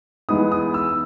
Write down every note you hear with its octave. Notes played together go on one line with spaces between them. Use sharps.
E3 G#3 B3 D#4 D#6
D#6
E6